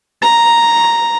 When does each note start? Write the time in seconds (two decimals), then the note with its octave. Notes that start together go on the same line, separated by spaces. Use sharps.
0.22 A#5